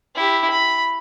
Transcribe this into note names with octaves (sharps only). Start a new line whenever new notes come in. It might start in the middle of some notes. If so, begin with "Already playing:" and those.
E4 G4
B5